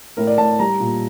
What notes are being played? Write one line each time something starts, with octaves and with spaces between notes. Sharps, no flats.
A2 A#4
D5
A2 A5
G3 A#5
A#2